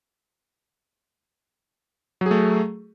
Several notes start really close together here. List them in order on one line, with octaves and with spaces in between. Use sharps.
F#3 G#4 A3